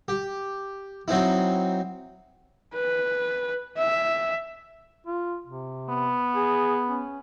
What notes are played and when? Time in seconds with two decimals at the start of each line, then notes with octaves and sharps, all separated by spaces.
0.08 G4
1.08 F#3 C4 D#4 E4
2.75 B4
3.78 E5
5.07 F4
5.47 C3
5.90 B3
6.35 G#4
6.89 C#4